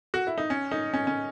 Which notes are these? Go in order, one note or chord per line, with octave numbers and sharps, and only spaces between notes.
F#4
E4
D#4
C#4
D#4
C#4
C#4